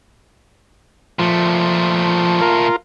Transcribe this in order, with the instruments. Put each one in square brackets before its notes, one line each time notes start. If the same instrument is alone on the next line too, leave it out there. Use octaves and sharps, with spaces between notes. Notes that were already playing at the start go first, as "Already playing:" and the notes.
[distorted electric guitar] A#2 A3 [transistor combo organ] F3
[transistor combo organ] F4 A#4